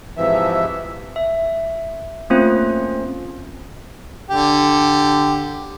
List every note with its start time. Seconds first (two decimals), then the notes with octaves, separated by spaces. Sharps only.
0.17 G#2 C3 E3 F3 E5
1.16 E5
2.30 A3 A#3 C4 C#4 F4 C5
4.30 D3 G4